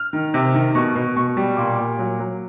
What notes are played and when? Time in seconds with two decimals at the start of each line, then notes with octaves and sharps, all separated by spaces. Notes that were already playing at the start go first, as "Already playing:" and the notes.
Already playing: F6
0.13 D#3
0.34 C3
0.54 D#3
0.75 B2 C#6
0.95 B2
1.16 B2 C#6
1.37 G3
1.57 A#2 D6
1.79 A#2
1.99 F#3
2.20 F#3